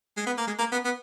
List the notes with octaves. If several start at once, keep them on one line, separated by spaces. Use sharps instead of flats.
G#3
B3
A#3
G#3
A#3
B3
B3